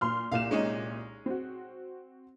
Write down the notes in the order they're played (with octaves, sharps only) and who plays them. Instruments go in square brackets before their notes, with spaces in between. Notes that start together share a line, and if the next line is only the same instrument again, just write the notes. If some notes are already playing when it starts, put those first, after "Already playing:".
[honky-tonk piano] A#2 C6 F6
[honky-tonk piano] C2 A#2 E7 [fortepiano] F5
[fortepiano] G#3 C#4 D#4
[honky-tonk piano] C4 F#4